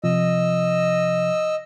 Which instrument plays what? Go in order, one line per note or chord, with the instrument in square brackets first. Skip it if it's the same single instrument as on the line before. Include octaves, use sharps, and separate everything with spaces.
[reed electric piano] C3 F3 [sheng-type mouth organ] D#5 E6